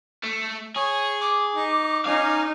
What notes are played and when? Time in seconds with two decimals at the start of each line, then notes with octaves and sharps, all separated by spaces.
0.24 A3
0.76 G#4 C#5
1.21 D6
1.55 D#4
2.06 C#4 D#4 F5